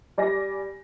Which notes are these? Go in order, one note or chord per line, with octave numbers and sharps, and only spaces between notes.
G3 D5 G#5 A#6